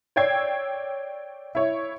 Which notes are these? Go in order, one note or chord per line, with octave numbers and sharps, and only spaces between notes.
C#5 D5 G5 E6 G#6 C7
E4 C#5